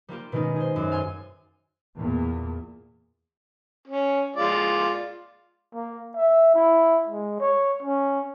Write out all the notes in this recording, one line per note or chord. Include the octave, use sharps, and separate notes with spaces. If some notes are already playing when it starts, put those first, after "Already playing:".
G3 A#3 F4 G4
B2 D#3 G#3 C#4 D#4
G#4 C5
F#2
A4 F5 G#5 C6
E2 A#2
C#4
G#3 F4 D5
A#3
E5
E4
G#3
C#5
C#4